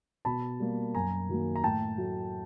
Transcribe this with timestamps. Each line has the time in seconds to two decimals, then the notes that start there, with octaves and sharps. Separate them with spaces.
0.25 B2 A5 B5
0.60 G3 A#3
0.95 F#2 G#5 A#5
1.29 D#3 F#3 A#3
1.56 A#5
1.64 A2 G5 A5
1.98 F#3 A3